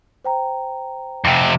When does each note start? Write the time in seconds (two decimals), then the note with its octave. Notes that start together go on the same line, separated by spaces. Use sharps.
0.25 C5 G5 A#5
1.25 F2 C3